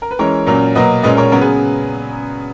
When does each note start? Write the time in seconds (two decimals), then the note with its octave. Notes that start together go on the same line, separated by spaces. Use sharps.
0.02 A#4
0.11 B4
0.19 E3 G#3 C#4 A#4 C#5
0.46 A#2 F#3 A#3 C#4
0.75 B2 F#3 A#3 B4 D#5
1.03 A#2 G#3 C#4 B4 D#5
1.17 A#4 C#5
1.31 C#3 F#3 B3 A#4 C#5
1.41 G#4 B4